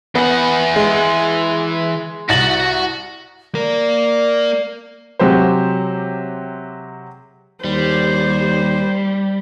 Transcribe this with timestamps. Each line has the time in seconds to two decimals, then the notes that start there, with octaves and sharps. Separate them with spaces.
0.15 E3 B3 F#5
0.76 G#3
2.29 C2 F#4 A6 F#7
3.55 A#3 A#4 D5
5.19 C3 F#3 G#3 G4 C5
7.64 D#2 G3 C5